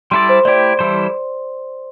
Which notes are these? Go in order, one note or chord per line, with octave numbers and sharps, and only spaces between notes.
G3 E4 A4 D5 C6
C5
A3 E4 G4 D5
E3 G3 E4 A4 C5